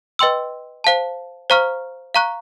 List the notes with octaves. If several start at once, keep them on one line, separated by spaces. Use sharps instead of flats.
B4 D#5 G5 C6 E6
C5 F5 A5
C5 F5 A#5 C#6 F6
F5 A#5 C#6 F#6